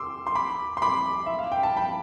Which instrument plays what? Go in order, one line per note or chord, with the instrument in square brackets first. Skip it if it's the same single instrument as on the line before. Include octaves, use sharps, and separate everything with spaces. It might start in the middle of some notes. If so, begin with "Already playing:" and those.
Already playing: [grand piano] C6 D6 E6
C6
B5 D6
C6
B5 D6
E5
F5
G5
A5
G5 B5